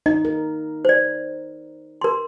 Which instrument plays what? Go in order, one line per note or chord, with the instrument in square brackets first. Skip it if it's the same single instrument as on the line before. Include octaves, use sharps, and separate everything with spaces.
[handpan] D#4 [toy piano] D#5
[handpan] A#4
[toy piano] C5 D5
A#4 C6